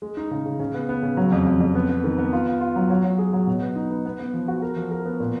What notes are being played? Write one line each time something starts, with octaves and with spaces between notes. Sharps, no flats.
G#3
D#4
C#3
C#3
C#3
B3
B3
C#3
F#3
F2
F2
F2
B3
B3
D#3
B3
F4
F4
F4
F#3
F#3
F#3
G#4
F#3
B2
B3
D#4
B3
B3
B3
F3
F#4
A#4
F3
A#4
B3
A#2